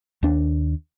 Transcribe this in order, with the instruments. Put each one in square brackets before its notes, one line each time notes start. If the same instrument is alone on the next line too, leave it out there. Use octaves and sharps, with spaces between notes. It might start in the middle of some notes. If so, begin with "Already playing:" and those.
[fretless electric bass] D#2 D4